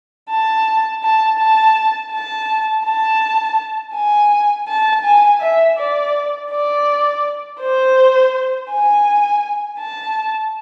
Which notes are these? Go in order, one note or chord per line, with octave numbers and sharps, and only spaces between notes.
A5
A5
A5
A5
A5
G#5
A5
G#5
E5
D5
D5
C5
G#5
A5